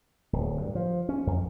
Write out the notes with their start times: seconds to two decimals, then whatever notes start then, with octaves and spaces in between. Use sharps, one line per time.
0.33 D1
0.57 G2
0.75 F3
1.09 C#4
1.27 F2